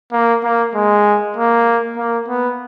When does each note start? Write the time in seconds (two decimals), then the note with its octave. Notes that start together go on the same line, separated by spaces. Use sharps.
0.12 A#3
0.44 A#3
0.75 G#3
1.37 A#3
1.97 A#3
2.28 B3